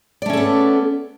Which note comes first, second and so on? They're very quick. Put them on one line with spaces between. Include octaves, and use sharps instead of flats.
D5 A3 C#4 A4 B3